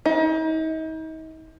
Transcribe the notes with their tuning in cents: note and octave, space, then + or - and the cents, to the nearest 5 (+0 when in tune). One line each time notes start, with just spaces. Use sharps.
D#4 +40